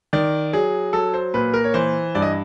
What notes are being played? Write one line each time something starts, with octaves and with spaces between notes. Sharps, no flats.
D#3 D5
F#3 G#4
F#3 A4
C5
A#2 B4
A#4
C#5
E3 C5
G2 D5
D#5